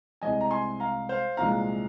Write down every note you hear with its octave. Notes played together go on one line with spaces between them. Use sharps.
C2 C3 G#3 D#5 G#5
A#5
G#5 C6
F5 A#5
C5 F5
C2 A#2 F3 G#3 F5 A#5